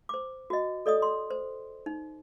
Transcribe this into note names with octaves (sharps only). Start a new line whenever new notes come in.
C5 D6
F#4 D#5
A4 D5 D#5 D#6
C6
C5
D#4